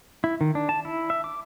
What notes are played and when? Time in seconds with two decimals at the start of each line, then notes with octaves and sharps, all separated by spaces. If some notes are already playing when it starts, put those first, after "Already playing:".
0.24 E4
0.41 D#3
0.55 D4
0.69 A5
0.85 E4
1.10 E5
1.24 D6